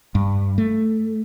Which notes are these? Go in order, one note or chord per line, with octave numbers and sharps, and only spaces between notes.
G2
A3